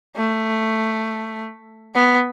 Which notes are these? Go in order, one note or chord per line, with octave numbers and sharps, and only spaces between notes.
A3
B3